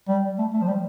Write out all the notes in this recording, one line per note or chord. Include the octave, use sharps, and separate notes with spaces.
G3
A3
A3
F3
G3